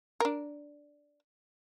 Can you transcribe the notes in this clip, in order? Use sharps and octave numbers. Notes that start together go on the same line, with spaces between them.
D4 A#4